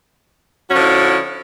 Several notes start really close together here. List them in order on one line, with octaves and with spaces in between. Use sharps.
F#4 C#4 D3 F3 E4